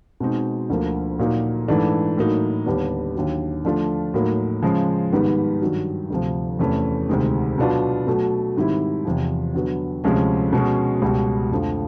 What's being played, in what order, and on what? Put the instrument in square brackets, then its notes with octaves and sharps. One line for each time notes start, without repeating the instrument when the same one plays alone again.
[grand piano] B2 G#3 C4 D#4
D2 D3 F3 A#3
A#2 F#3 A#3 D#4
G#2 E3 A3 D4
A2 F#3 A#3 D#4
D#2 D3 G3 B3 D4
D#2 D3 F#3
D3 F3 A3 D4 F4
A2 F#3 A#3 D#4
C#3 F3 G#3
G#2 D#3 G3 B3
G2 D#3 F#3
D2 C3 F3
E2 C3 E3 A3 C#4
D2 C3 D#3 G#3
B2 F#3 B3 D4 F4
B2 F#3 A3
G#2 D#3 G3 C4 E4
E2 C3 F3
D3 F#3 B3
D2 C3 F3 G#3 C#4
B2 G#3 C#4
C#2 B2 G3
F2 D3 F3 A3